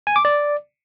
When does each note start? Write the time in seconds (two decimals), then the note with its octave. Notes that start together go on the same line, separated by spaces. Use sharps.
0.07 G#5
0.16 D6
0.25 D5